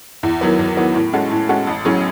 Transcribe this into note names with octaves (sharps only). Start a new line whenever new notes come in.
E2
D#3 F#3 B3
E2
D#3 F#3 B3
A2
G#3 C#4 F#4 A4
A2
G#3 C#4 F#4 A4
A1
A2 F#3 C#4 G#4